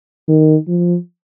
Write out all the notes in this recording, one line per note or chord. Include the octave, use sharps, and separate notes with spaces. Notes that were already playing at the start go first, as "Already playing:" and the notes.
D#3
F3